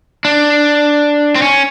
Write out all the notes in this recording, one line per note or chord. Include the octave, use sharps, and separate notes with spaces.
D4
C4
C#4